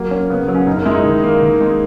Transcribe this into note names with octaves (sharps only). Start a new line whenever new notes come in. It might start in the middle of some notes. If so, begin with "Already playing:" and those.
Already playing: F#3 A#3
C#4
C#3 B3
F#3
C#4
F#2 D#4
A#4
G#3 E4
D#4
D#3
A#3
D#3
G#3